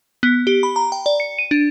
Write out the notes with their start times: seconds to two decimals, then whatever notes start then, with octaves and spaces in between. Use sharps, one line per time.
0.23 B3
0.47 G4
0.63 B5
0.76 A#5
0.92 G5
1.06 D5
1.20 C#7
1.39 D#7
1.51 D4